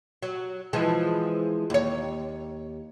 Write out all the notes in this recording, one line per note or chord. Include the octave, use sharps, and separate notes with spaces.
F#3
E3 F3 G#3
D#2 C#5